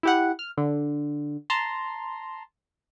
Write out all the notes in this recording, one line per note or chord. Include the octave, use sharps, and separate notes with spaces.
E4 G4 F#5
F6
D3
A5 A#5 C6